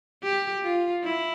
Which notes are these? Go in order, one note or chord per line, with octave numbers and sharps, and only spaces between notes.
G4
F4
E4